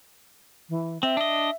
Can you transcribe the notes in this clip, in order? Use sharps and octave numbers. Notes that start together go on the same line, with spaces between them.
E3
C4 E5
D4 D#5